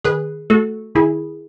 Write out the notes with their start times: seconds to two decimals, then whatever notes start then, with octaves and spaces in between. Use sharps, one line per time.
0.04 D#3 G#4 B4
0.50 A3 F#4 A4
0.95 D#3 E4 G#4